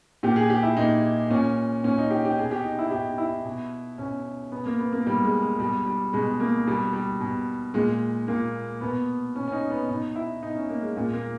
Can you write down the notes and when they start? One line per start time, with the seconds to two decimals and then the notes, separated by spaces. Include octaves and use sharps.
0.23 A#2 G4
0.36 G#4
0.50 G4
0.63 E4
0.77 A#2 D#4
1.30 A#2 C#4
1.84 A#2 C#4
1.98 D#4
2.10 G4
2.25 G4
2.38 B2 G#4
2.51 G4
2.64 D#4
2.79 E4
2.91 B2 G4
3.18 E4
3.45 B2
3.98 B2 C#4
4.52 B2 B3
4.66 A#3
4.80 B3
4.93 A#3
5.06 B2 G3
5.24 G#3
5.41 G#3
5.59 B2 G3
5.86 G3
6.13 B2 G#3
6.40 A#3
6.67 B2 G3
6.93 G3
7.20 B2
7.74 A#2 G#3
8.28 A#2 A#3
8.81 B2 B3
9.35 B2 C#4
9.48 C#4
9.52 D#4
9.70 B3
9.88 B2 D#4
10.16 E4
10.43 B2 D#4
10.56 C#4
10.70 A#3
10.82 G#3
10.97 A#2 G#3
11.13 A#3